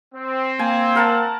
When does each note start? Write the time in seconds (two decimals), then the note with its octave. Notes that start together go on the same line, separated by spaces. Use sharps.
0.15 C4
0.59 A#3 G#5
0.96 A#4 F#5 A5